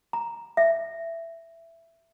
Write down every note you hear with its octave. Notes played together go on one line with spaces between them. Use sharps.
A#5
E5